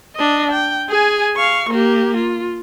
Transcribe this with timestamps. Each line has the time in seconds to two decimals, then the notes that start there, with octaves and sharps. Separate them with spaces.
0.16 D4 D#5
0.52 G5
0.89 G#4 G#5
1.37 F5 C#6
1.70 A#3 G4
2.17 F4